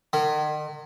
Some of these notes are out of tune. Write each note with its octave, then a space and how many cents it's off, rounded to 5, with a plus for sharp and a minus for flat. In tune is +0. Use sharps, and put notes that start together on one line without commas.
D#3 -40